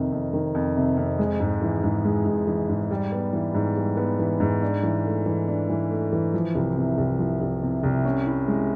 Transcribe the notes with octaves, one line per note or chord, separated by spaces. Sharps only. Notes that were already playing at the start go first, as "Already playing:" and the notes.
Already playing: F2 C3 D#3
F2
D#3
F2
C3
F2
G#3
G#2
E3
G#2
G#3
G#2
E3
G#2
G3
B3
E3
G#2
G3
B3
E3
G#2
D4
E3
A3
E3
D4
E3
A3
E3
F3
C2
C3
C2
F3
C2
C3
C2
C#4
E4
G#3